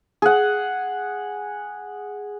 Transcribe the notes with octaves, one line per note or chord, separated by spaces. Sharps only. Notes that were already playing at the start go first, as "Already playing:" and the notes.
G#4 F#5